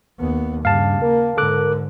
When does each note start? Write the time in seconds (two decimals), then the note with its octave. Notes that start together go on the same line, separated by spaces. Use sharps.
0.19 D#2 B3
0.65 G2 C#3 G3 F5 A5
1.02 A#3 A#4
1.37 G#2 D3 A4 D6 F#6